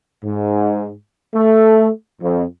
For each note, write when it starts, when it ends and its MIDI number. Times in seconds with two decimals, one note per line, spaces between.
0.24 0.91 44
1.34 1.89 57
2.22 2.44 41